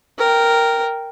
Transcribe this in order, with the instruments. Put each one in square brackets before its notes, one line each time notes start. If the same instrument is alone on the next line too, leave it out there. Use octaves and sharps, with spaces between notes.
[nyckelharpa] A#4 G5